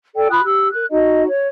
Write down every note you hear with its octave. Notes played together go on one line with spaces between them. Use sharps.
A4 D5 G5
F4 B5 D#6 F#6
G4 E6
A#4 F#6
D#4 F#4 D#5
C#5